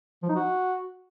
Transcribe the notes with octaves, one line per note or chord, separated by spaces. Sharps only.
F3
D#4
F#4